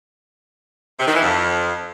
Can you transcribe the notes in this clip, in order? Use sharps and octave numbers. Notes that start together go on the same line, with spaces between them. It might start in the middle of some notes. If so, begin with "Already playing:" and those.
C3
D#3
E3
F2